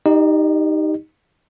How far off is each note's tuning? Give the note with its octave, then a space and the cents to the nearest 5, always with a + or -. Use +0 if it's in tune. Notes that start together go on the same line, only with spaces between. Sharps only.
D#4 +5 G4 +0 D#5 -45